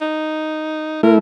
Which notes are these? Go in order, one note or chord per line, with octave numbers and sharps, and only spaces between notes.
D#4
A3 E4 A#4